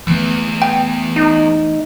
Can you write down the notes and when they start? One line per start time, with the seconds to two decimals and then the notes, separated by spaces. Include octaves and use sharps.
0.07 E2 E3 A3 B3
0.62 G5
1.16 D#4